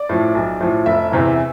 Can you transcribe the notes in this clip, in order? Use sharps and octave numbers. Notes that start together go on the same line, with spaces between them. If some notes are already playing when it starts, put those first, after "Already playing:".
Already playing: D5
A2 F3
B1
A2 F3
F1 E5
E2 C3 E3